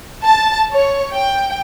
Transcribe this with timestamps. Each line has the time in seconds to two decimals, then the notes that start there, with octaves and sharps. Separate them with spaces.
0.25 A5
0.72 C#5
1.12 G5